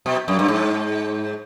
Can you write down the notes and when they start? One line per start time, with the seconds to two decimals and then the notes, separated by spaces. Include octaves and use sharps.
0.06 B2
0.28 F#2
0.39 G2
0.48 G#2